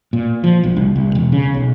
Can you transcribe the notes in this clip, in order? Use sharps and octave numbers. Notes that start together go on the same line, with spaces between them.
A#2
F3
A#1
C2
C2
E1
C#3
B1